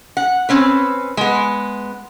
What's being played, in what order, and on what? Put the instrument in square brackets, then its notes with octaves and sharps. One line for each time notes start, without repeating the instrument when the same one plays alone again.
[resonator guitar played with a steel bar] F#5
C4 C#4 B4
G#3 B3